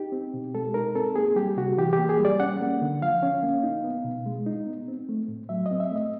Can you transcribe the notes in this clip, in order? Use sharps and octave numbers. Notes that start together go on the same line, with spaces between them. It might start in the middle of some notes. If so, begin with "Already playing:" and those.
Already playing: D#4 G4
C4
B2
G#3 A4
D#4 A#4
C4 A4
A#3 G#4
G3 G4
C3 F#4
E3 G4
G4
A#3
G#4
G3
D5
C#4 F#5
A#3
D3
F3 F5
C#4
A#3
D#4
B3
B2
G#3
D#4
B3
C4
A3
A2
F#3 E5
D#5
C4
E5
A3
D#5